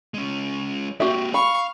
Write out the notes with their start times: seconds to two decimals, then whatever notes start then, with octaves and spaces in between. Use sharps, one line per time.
0.14 G#3 C#4
1.00 A#3 C4 F#4 G4 E5
1.34 F5 B5 C#6